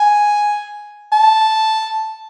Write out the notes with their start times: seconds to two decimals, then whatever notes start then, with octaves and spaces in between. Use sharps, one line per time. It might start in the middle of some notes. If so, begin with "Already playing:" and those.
Already playing: G#5
1.12 A5